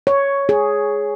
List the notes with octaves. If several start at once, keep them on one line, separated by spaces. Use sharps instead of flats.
C#5
G#4